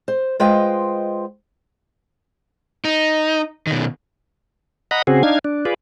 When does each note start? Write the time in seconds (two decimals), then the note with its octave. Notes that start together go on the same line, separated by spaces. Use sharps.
0.08 C5
0.40 G#3 F4 B4 C5 D#5 G5
2.85 D#4
3.67 B2 D#3
4.91 D#5 F#5 A#5 B5
5.07 C#3 C4 F#4 G#4
5.23 D4 D#4 F5 G#6
5.44 D4
5.65 F4 G#4 B4 D5